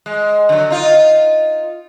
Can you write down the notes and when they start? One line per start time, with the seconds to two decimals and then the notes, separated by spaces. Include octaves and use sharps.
0.06 G#3
0.49 D3 F#3
0.70 D#4 F4